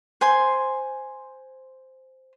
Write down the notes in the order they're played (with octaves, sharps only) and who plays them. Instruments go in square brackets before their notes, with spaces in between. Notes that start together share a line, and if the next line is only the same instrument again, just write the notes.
[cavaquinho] C5 G#5 C6